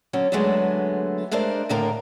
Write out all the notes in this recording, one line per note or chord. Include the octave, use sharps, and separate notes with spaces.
D3 F#3 C#4
D3 F#3 G#3 A3 B3 D4
G#3 A3 D4 A#4 C5 D5
D#2 A2 D3 A#3 A#4 A#5